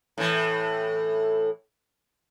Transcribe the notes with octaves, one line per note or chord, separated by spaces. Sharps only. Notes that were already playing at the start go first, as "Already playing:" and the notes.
A2 E3